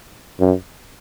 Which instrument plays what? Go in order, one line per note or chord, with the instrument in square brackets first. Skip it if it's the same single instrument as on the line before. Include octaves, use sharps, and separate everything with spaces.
[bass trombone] F#2